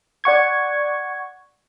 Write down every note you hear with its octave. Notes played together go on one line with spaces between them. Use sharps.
D5 F#5 C#6 G#6